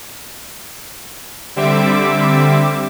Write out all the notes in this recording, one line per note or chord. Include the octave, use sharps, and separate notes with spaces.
D3 G3 C4 E5 D6